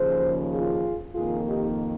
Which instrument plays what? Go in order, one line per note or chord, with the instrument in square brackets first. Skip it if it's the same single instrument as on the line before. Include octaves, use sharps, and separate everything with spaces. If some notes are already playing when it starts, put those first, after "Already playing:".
Already playing: [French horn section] D#2 C#3 F3 G#4 C5
F4 G#4
F2 D#3 A#3 F4 G#4
D#4 G4